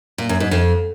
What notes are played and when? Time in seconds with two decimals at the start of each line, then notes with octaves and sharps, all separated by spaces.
0.18 A#2
0.29 F#2
0.40 G#2
0.51 F2